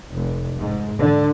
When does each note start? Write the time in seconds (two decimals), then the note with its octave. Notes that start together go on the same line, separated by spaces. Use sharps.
0.12 F1
0.58 G#2
1.00 D3